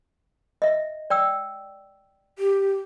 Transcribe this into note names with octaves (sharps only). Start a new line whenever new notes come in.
D#5 E5
D5 G5 E6
G4